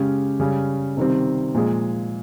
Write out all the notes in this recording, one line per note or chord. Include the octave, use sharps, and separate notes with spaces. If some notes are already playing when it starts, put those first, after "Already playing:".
Already playing: C#3 G#3 C#4 G4
C#3 G3 C#4
C3 D#3 G3 C4
A#2 F3 G#3